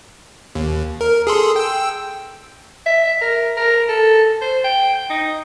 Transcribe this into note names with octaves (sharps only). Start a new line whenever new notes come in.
D#2
A#4
G#4 A4 C6
G5 E6
E5
A#4
A#4
A4
C5
G5
D#4